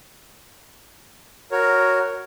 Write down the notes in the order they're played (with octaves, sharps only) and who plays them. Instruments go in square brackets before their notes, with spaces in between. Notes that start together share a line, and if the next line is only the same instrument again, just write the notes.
[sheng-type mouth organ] F#4 A#4 C#5